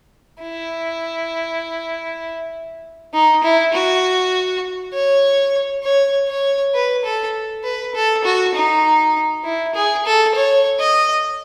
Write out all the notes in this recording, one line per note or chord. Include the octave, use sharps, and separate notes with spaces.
E4
D#4
E4
F#4
C#5
C#5
C#5
B4
A4
B4
A4
F#4
D#4
E4
G#4
A4
C#5
D#5